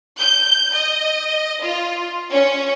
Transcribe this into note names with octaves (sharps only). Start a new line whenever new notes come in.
G6
D#5
F4
C#4